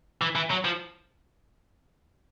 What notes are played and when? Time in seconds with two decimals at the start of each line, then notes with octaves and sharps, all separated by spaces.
0.21 E3
0.35 E3
0.51 F#3
0.65 F3